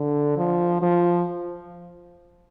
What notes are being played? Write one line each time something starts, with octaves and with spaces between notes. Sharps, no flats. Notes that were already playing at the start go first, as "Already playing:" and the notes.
Already playing: D3
F3
F3